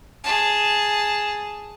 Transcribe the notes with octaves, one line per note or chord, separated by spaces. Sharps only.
G#4 A5